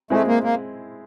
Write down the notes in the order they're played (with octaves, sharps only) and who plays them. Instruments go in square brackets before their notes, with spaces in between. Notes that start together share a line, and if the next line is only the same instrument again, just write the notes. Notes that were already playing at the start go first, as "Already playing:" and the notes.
[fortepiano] G#3 C4 E4 [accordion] A3
[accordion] A#3
A#3